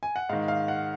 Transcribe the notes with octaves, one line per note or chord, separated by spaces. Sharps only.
G#5
F#5
G#2 D#3 F5
F5
F#5